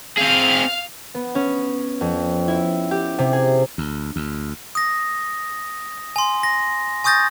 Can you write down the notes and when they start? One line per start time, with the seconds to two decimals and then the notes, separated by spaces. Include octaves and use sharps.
0.18 C4 G#4 F5 F6
1.14 B3
1.35 C#4
2.01 F2
2.48 E4
2.91 G4
3.18 C3
3.33 G#4
3.78 D2
4.16 D2
4.75 D#6 A#6
6.16 G#5 C6
6.43 A#6
7.04 G#5 C#6 D#6 G6 A6 A#6